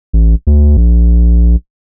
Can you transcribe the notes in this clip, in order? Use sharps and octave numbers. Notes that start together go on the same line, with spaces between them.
A1
D2
A#1